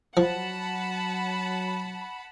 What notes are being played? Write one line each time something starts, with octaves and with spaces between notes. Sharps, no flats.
F3 F#3 F#5 A5 B5